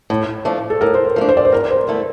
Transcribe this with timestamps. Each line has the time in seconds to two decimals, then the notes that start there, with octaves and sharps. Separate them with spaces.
0.10 A2
0.45 F3 A3 D4
0.70 A4
0.81 A2 A#4
0.94 C5
1.05 A#4
1.16 F3 A3 D4
1.29 C5
1.37 D5
1.45 C5
1.52 E2 A#4
1.71 C5
1.76 A#4
1.88 D3 A3 E4